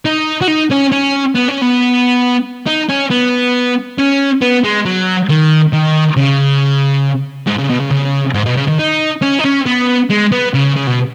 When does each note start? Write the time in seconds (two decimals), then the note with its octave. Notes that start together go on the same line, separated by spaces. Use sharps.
0.05 D#4
0.41 F#4
0.48 D#4
0.71 C#4
0.92 C#4
1.35 B3
1.49 C#4
1.62 B3
2.67 D#4
2.89 C#4
3.11 B3
3.98 C#4
4.42 B3
4.64 G#3
4.85 F#3
5.29 D#3
5.73 D#3
6.17 C#3
7.47 G#2
7.59 C#3
7.70 B2
7.80 C#3
7.91 C#3
8.34 G#2
8.46 B2
8.57 C#3
8.68 D#3
8.79 D#4
9.22 C#4
9.39 D#4
9.45 C#4
9.66 B3
10.10 G#3
10.32 B3
10.54 C#3
10.76 C#3
10.87 B2